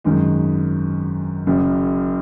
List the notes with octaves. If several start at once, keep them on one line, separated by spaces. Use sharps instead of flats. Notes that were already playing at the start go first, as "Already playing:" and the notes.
G#1 F#2 D#3 G#3 D#4
F#1 F#2 C#3 F#3